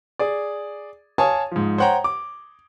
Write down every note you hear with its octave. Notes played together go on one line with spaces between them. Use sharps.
G#4 D5
C#5 F5 G#5 A5 D#6
G#2 F3
C5 C#5 F#5 G5 A#5
D6